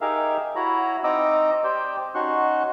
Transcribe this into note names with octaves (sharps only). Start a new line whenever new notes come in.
D#4 G4 G#4 A#4 E5 F5
E4 F#4 C#5 A#5 B5
C4 D#4 D#5 A#5 D6 E6
G4 C5 D5 G5
C#4 D#4 F#4 C6 C#6 F#6